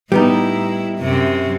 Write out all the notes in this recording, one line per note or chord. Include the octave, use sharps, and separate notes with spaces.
A2 G3 B3 D#4 E4
F#2 C3